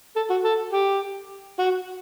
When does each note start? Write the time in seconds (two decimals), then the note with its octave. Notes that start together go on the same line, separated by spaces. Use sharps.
0.16 A4
0.30 F#4
0.44 A4
0.73 G4
1.59 F#4